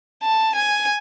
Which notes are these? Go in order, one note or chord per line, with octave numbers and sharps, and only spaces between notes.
A5
G#5